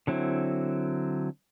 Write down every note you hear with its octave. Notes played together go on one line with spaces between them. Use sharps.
D3 F#3 C4 E4